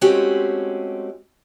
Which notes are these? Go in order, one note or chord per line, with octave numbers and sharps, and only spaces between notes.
G#3 A3 C4 C#4 F#4 G4